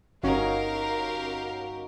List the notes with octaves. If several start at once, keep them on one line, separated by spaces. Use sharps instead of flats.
G1 C#4 D#4 F#4 G4 A#4 F5 A#5